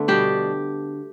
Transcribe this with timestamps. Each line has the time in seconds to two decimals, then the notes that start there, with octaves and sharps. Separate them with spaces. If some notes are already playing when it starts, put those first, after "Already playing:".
Already playing: D3 A3 B3
0.08 B2 G3 D4 G4